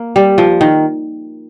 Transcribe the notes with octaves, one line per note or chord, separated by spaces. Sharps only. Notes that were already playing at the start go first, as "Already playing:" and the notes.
Already playing: A#3
G3
F3
D#3